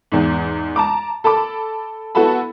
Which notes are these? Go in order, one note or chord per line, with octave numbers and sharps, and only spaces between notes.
E2 G#2
A5 A#5 D6
A4 A5 B5 D6
B3 E4 F#4 A4 A5 B5